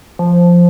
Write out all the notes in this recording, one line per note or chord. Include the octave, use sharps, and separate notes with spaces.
F3